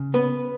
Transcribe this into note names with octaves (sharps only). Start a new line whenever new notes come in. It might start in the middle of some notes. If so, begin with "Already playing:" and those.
Already playing: C#3
B3 B4